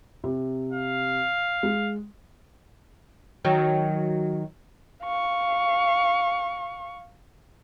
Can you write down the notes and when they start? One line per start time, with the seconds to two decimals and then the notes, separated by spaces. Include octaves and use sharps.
0.24 C3
0.73 F5
1.63 G#3
3.45 D#3 F#3
5.03 F5 C#6